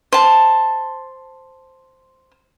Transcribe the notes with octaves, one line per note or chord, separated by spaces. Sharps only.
C5 A5